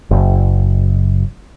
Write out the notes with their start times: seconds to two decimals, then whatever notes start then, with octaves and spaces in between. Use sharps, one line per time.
0.11 F#1